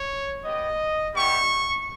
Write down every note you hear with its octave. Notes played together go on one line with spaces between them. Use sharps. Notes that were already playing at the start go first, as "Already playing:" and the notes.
Already playing: C#5
B3 G4 D#5
G3 B3 E4 G4 C#6